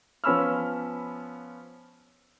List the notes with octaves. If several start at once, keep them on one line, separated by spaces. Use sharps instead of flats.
F3 B3 C#4 B5 E6 F6